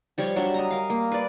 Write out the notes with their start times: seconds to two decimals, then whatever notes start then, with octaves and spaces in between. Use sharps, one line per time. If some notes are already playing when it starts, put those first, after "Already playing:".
0.18 F3 G3 F4 C#5
0.36 F#3 G3 D4 E5
0.54 D#5 A#5
0.71 A#4 F5
0.90 A#3
1.12 B4 D5